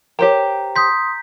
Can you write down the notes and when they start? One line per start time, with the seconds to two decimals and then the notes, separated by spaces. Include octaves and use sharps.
0.19 G4 A#4 C5 C#5 G5 A#5
0.76 C6 D#6 G6 B6